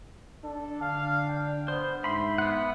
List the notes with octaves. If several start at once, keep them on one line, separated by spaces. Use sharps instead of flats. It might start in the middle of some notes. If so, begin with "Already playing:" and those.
D4 A4
D3 F5
G5
B3 C5
G#2 E5 B5 C6
B3 F#5